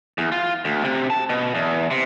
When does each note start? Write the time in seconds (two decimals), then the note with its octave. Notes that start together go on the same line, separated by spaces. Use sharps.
0.18 E2
0.32 F4
0.65 D2
0.84 C3
1.10 A5
1.29 B2
1.55 E2
1.91 C3